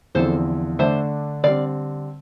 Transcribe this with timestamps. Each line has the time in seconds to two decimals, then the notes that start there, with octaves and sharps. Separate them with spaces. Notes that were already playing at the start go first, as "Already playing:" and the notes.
0.15 E2 D3 F3 C4 E4 A4 C5
0.79 D3 A3 D4 C5 E5
1.44 D3 G3 C4 D5 F5